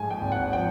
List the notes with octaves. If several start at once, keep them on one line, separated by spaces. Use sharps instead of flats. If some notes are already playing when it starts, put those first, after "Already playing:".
Already playing: G#2 F3 G#3 G#5
G5
G#1
F#5
F3 G5